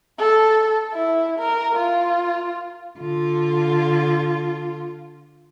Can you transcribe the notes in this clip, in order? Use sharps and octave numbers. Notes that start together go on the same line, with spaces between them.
A4
E4
A#4
F4
D3 F4